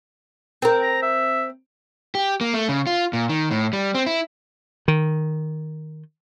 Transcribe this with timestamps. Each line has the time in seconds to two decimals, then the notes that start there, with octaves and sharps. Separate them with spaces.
0.62 C4 A#4
0.82 A#5
1.02 E5
2.15 G4
2.41 A#3
2.54 A3
2.69 C#3
2.87 F4
3.13 A#2
3.29 D#3
3.51 A2
3.73 G3
3.94 C4
4.06 E4
4.88 D#3